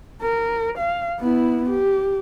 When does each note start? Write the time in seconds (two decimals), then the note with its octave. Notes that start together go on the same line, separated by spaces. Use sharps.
0.22 A#4
0.78 F5
1.20 B3 E4
1.70 G4